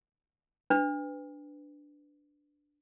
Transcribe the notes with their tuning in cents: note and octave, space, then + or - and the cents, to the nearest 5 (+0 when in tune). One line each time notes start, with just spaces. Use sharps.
D4 +0 B4 +20